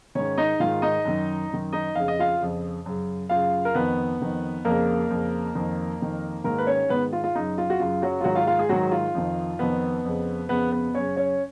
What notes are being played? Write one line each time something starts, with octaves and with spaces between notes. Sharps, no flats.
G#2 D#3 C#4 C#5
D#4 D#5
G#2 D#3 F4 F5
D#4 D#5
F#2 D#3
F#2 D#3
D#4 D#5
F2 C#3 F5
D#5
F4 F5
F2 C#3
F#2 C#3
F#2 C#3 F4 F5
A#4
F2 D#3 B3 B4
F2 D#3
F2 C#3 A#3 A#4
F2 C#3
F2 D#3
F2 D#3
G#2 D#3 A#3 A#4
B4
C#4 C#5
G#2 D#3 B3 B4
F4
F4
F#2 C#3 D#4
F4
F#4
F#2 C#3 F4
F#3 F#4
F4
G#2 D#3 F#3 F#4
F4 F5
F4 F5
G#3 G#4
G#2 D#3 F#3 F#4
F4
F2 D#3
F2 D#3 B3 B4
F2 C#3
F2 C#3 B3 B4
B3 B4
F#2 C#3 C#4 C#5
C#4 C#5